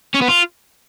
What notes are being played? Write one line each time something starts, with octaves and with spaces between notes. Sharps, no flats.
C#4
B3
F4